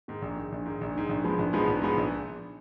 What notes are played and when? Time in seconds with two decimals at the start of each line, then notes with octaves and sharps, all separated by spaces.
0.08 G#2 D#3
0.22 A#1
0.36 G#2 D#3
0.52 A#1
0.66 G#2 D#3
0.81 A#1
0.95 G#2 D#3
1.09 A#1
1.24 G#2 F3 G#3 B3
1.39 A#1
1.53 G#2 F3 G#3 B3
1.67 A#1
1.82 G#2 F3 G#3 B3
1.97 A#1